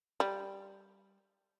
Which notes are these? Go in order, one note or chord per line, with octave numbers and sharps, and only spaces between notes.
G3